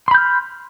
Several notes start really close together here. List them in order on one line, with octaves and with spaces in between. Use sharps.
C6 B5 G6 F6